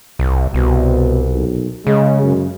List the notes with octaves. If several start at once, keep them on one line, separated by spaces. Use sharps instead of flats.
C2
C2 B2
B1
C#3 G#3
F#2